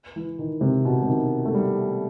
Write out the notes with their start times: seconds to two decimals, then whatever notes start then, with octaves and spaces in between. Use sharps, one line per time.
0.16 E3
0.39 D#3
0.61 C3
0.85 B2
1.02 C3
1.08 D#3
1.45 A3
1.54 G3